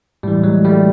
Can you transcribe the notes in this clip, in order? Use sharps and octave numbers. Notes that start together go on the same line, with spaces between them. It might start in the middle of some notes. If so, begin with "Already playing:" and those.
A2 E3 G3
F#3 G#3
G3 A3